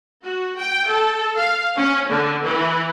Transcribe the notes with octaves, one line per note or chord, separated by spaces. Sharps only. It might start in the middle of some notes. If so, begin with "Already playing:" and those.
F#4
G5
A4
F5
C#4
D3
E3